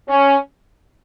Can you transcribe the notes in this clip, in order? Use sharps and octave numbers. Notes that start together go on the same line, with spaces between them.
C#4